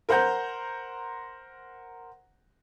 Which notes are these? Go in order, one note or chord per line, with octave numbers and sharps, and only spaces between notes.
A#4 C5 F#5 A#5 G6